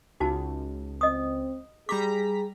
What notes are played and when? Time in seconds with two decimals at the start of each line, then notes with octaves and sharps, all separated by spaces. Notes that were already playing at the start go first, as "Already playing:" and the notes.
0.20 C#2 D#4 F#4 A5
1.01 C4 D#5 D#6
1.89 G3 G#4 A#5 D6 B6